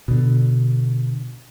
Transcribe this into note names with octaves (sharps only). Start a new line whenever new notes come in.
B2 D3